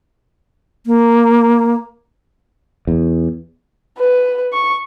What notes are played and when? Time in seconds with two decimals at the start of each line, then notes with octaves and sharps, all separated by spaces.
0.86 A#3
2.87 E2
3.98 B4
4.53 C#6